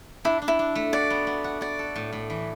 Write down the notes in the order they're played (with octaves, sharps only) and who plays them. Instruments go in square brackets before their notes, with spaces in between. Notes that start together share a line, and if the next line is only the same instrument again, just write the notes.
[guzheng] D4 [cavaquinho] E4
[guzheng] D4
[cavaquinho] E4
[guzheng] D4
A3
[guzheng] F#4 [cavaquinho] D5
[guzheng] B3
B3
F#4
[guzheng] F#4 [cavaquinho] D5
[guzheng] A4
A2
A2
E3